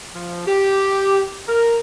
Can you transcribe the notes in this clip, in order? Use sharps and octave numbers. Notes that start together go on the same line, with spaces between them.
F3
G4
A#4